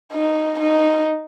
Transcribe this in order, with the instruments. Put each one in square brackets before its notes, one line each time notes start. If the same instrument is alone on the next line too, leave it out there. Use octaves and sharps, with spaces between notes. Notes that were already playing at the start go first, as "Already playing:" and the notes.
[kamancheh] D#4
D#4